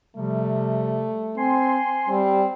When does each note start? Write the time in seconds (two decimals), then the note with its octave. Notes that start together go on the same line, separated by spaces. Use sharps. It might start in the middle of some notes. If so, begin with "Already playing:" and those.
0.16 C3 F3 G3 A3
1.38 C4 G#5 C6
2.09 G3 C4